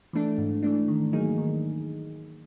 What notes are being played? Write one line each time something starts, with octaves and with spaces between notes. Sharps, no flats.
E3 A3 D4
G#2
E3 A3 D4
D#3
F#3 A#3 D#4 G#4
D#3